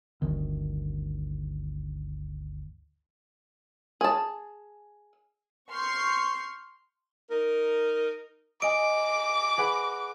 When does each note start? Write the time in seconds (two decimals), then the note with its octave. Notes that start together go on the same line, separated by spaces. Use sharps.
0.22 G1 D2 D#3
4.01 G#4 A5
5.71 C6 C#6 F6 G6 C7
7.30 D#4 A#4
8.62 D#5 G#5 D6 D7
9.57 G#4 B4 F#5